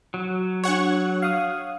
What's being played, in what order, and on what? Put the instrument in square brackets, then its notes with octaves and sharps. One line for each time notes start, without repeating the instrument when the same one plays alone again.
[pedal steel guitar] F#3
[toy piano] D4 G#4 [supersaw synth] C#5 F#5 C#6
[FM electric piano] F5 D#6